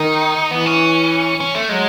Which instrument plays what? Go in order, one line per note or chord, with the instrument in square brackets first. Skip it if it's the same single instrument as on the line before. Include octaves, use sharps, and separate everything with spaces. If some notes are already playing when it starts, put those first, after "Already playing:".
Already playing: [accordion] D#3 [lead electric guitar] D#4
[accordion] E3 [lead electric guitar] B3
[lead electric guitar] C#4
C#4
A3
[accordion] F#3 [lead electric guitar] G#3